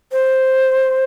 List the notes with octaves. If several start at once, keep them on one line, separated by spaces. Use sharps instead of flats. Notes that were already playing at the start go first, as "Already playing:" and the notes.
C5